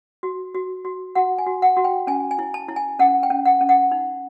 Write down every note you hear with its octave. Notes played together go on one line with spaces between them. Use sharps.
F#4
F#4
F#4
F#4 F#5
G#5
F#4
F#5
F#4
G5
C#4 G#5
G#5
E4
A5
E4
G#5
C#4 F#5
G5
C#4
F#5
C#4
F#5
D#4